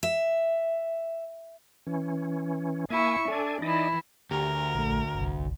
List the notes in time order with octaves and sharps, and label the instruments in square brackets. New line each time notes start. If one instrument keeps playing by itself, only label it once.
[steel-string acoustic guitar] E5
[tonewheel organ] E3 C#4
[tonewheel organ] A#3 G#5 [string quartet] E4 E5 C#6
[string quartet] D4 [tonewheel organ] A4 G#5
[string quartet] E3 E4 [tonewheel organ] D#4 D5 D#5
[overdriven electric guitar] D2 [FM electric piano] G4 [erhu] A#4
[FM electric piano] A#1 A3
G1 C2